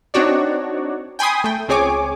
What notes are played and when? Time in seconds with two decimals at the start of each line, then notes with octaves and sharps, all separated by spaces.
0.14 C4 D4 D#4 F#4 C#5 D5
1.19 G5 G#5 B5 C6 D#6
1.44 A3 G5
1.68 C#2 C4 G#4 C#5 G#5 D6